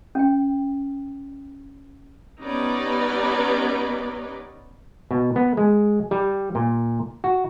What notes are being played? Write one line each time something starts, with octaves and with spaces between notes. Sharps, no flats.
C#4 G5
G3 B3 C#4 D#4 B4 D5
B2
B3
G#3
G3
A#2
F#4